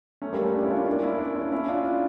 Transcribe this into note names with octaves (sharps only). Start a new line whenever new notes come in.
A3 C#4
G3 A#3
A3 C#4
A#3 D4
C#4 E4
D4 F4
C#4 E4
A#3 D4
C#4 E4
A#3 D4
C#4 E4
C#4 E4
D4 F4
D4 F4